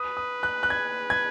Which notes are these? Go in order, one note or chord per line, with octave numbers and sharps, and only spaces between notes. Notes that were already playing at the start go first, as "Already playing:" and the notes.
Already playing: B4 D#6
D#6
F#6
F#6
G#6
G#6